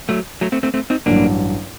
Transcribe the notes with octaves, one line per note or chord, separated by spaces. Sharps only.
F#3 A3
F#3 A3
A3 C4
A3 C4
A3 C4
C4 D#4
A1 G2 F#3 A#3 D4